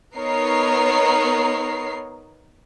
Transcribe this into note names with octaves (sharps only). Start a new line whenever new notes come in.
B3 D#4 A#4 C#5 C7